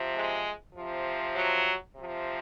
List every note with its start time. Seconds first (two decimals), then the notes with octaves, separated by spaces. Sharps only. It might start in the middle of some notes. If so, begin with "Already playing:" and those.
Already playing: C3 F3
0.14 G#3
0.75 C3 F3
1.36 F#3
1.96 C3 F3